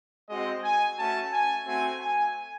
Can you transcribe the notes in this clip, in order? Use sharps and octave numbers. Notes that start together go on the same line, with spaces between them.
G#3 C4 F#4 D#5
G#5
A3 C#4 F#4 A5
G#5
A3 C4 F#4 G#5
G#5